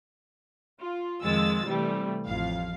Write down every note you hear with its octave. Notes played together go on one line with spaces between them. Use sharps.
F4
F2 D#3 G#3 F4 E6 A6
C3 E3 G3 A3
A1 F2 F5